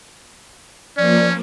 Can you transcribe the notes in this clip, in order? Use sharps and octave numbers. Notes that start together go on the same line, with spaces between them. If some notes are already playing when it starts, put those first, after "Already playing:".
F3 A#3 C#4 D5